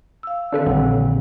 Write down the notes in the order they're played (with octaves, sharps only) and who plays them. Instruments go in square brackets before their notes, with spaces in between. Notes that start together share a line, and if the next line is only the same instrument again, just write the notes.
[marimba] F5 E6
[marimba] D3 D#3 C4 [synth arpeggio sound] D4 A4 B4
[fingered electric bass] A#1 [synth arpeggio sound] G2 D#3 [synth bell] D3 [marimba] F#5